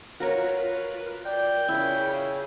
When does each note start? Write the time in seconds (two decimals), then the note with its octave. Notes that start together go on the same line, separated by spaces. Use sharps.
0.20 F4 F#4 A#4 B4 C#5
1.26 D5 G5
1.68 C#3 E4